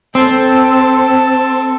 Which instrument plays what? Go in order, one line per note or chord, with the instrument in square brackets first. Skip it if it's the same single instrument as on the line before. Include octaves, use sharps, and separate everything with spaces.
[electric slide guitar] C4 [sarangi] A4